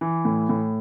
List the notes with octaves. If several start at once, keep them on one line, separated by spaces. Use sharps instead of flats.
E3
A2
A2